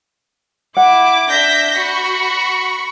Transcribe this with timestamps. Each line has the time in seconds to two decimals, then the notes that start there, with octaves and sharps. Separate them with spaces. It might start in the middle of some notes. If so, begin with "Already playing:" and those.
0.77 E4 F#5 D6
1.30 D4 E5 G6 A#6 B6
1.77 F#4 B5 C#6